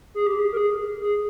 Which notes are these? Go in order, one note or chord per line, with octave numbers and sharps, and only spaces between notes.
G#4
G4
G#4
A#4
G#4
G#4